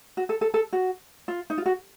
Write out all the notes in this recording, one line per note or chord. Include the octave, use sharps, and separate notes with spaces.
F#4
A4
A4
A4
F#4
F4
D#4
F4
F#4